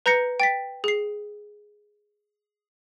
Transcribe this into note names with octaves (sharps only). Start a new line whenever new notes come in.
B4 A#5 G6 A#6 C#7
G5 A6 B6
G#4 C7